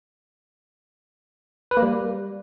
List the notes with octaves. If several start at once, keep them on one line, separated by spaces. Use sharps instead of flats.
B4
A#3
G3